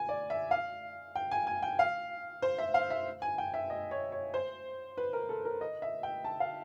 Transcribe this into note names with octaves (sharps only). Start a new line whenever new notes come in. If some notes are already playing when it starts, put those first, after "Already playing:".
Already playing: G#5
D5
E5
F5
G5
G#5
G#5
G5
F5
C5
E5
F5
E5
G#5
G5
E5
D#5
C#5
C#5
C5
B4
A#4
A4
A#4
D#5
E5
G5
A5
F5